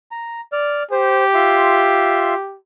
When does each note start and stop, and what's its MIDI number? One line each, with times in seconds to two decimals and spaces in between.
0.11 0.41 82
0.52 0.83 74
0.52 0.83 89
0.91 2.57 67
0.91 1.24 72
1.34 2.34 65
1.34 2.34 76
1.34 2.34 84